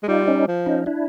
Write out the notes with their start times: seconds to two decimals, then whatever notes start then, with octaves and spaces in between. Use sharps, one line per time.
0.03 G#3
0.08 G3 D#4 F4
0.27 C#4 D#4
0.48 F3
0.66 C#4 D#4
0.86 D4 E4